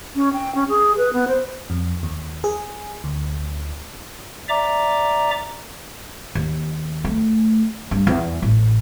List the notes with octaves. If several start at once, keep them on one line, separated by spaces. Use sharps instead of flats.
C#4
G5
C#4
G#4
B4
B3
C5
F2
D#2
G#4
D2
D5 E5 A#5 D6
D#2
A3
G2
E2
A1